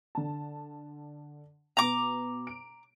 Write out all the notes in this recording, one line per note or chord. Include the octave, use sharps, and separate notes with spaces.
D3 A5
B2 B3 A#5 D6
D7